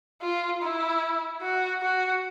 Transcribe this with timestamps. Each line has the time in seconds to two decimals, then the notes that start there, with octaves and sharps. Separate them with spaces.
0.22 F4
0.61 E4
1.42 F#4
1.82 F#4